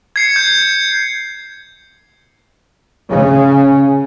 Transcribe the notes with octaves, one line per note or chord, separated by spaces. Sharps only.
G#6 C7 C#7
G6
C#3